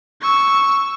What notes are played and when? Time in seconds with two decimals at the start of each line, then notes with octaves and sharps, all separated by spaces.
0.21 C#6 E6